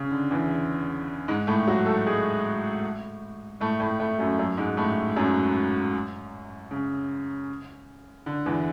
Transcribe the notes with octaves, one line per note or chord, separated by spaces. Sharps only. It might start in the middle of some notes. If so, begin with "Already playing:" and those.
Already playing: C#3
D3
E2 E3
G#2 G#3
A2 A3
F#3 F#4
A3 A4
G#3 G#4
A2 A3
A2 A3
A2 A3
F#2 F#3
F#2 F#3
G#2 G#3
A2 A3
F#2 F#3
C#3
D3
E2 E3